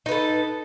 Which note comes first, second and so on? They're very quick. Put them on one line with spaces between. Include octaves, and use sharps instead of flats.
D#4 B4 A4